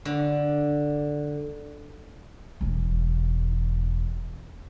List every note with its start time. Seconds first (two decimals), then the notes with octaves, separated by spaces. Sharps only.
0.05 D3
2.61 E1 E3